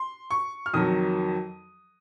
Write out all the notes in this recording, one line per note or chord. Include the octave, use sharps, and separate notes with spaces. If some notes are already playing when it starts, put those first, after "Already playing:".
Already playing: C6
C#6
F6
F2 D#3 F#3 D#6